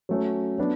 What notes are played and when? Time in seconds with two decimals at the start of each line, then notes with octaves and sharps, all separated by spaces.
0.09 F#3 A3 C#4
0.58 F#3 B3 D4